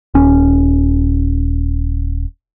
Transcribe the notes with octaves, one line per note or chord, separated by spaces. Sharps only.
D#1 C#4